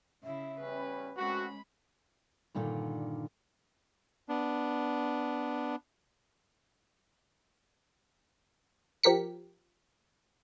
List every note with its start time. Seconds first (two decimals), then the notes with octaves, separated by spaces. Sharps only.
0.24 C#3 E4 E5
0.59 E2 G3 C#4 B4
1.18 A#2 G#3 A3 C4 C#4 F#4 B5
2.55 G2 A#2 D3 D#3
4.29 B3 D4
9.04 F3 G4 A#4 B6 C#7